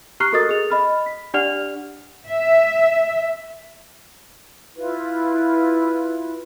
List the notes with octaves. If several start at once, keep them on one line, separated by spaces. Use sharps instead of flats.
G4 A#5 C#6 F6 F#6 C7
F#4 A4 A#4 D#5 D#6 A6
G#4 F7
D#5 B5 F6
B6
D4 G4 D5 F#5 F6 F7
E5
E4 F4 B4